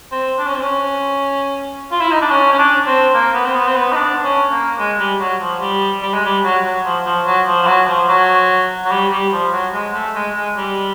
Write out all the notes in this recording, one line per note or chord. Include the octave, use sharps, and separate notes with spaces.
C4
D4
C#4
C4
C#4
F4
E4
D#4
D4
C#4
C#4
D4
C4
A#3
B3
C4
B3
C4
B3
D#4
D4
C#4
A#3
G#3
G3
F#3
F3
G3
G3
G#3
G3
F#3
F#3
F3
F3
F#3
F3
F3
F#3
F3
F#3
F#3
G3
G3
F3
F#3
G#3
A3
G#3
G#3
G3